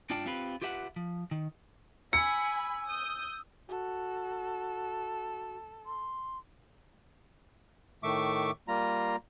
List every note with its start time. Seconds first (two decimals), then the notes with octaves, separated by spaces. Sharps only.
0.10 G#2 D4 F4 D5 G5 A5
0.26 C4 F4 G4 B4
0.62 F4 G4 B4 E5 F#5
0.96 F3
1.31 D#3
2.13 G#5 B5 E6 C#7
2.86 D#6 G6
3.69 F#4 A4
5.86 C6
8.03 A2 D#3 A3 E5 C#6 D6
8.68 G3 A#3 F4 A#5